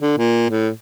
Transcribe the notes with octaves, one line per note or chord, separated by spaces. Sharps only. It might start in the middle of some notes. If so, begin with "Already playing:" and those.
D3
A#2
A2